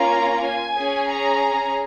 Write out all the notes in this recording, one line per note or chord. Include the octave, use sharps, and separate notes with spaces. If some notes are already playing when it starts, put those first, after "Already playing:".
Already playing: A#3 C#4 F4 A#5
G#5
C#4 G#4
A#5